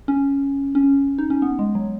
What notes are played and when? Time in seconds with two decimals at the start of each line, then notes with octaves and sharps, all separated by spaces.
0.08 C#4
0.75 C#4
1.18 D#4
1.30 C#4
1.42 B3
1.59 G#3
1.75 F#3